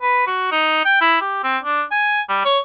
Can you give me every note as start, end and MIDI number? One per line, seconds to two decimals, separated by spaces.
0.02 0.25 71
0.27 0.48 66
0.51 0.80 63
0.85 1.01 79
1.01 1.16 64
1.21 1.43 67
1.44 1.58 60
1.63 1.83 62
1.92 2.21 80
2.29 2.44 55
2.45 2.59 73